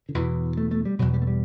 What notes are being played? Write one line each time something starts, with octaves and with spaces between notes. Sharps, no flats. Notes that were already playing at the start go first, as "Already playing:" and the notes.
D3
E2 B2 E3
A3
A3
G3
E2 B2 F#3
G3
A3
G3